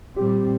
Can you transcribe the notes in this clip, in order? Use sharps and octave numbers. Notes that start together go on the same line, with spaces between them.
A#2 G3 C4 G4